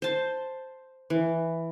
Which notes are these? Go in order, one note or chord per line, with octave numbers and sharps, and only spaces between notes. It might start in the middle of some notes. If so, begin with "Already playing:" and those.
C5 A5
E3